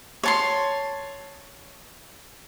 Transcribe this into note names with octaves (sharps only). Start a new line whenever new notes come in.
C#5 A5 C6